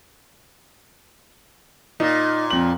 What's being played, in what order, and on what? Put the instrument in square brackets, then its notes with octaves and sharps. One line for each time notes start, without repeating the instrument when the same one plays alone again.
[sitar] A#2 [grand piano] D#4
[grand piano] F2 F#7